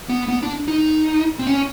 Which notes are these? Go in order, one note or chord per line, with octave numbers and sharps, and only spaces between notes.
B3
B3
D4
D#4
C4
C#4